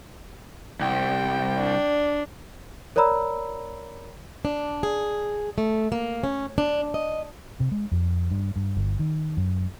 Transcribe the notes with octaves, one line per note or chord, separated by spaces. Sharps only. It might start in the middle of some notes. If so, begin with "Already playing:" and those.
C2 G5
D4
A#4 C#5 D5 A#5 B5 E6
D4
G#4
A3
A#3
C#4
D4
D#5
C3
G#3
F2
G2
G2
G1
D#3
F#2